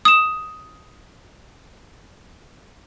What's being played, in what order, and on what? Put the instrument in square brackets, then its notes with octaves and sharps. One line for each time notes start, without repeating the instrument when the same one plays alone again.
[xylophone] D#6 E7